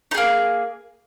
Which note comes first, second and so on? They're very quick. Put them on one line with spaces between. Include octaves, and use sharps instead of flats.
D#4 G#4 A#3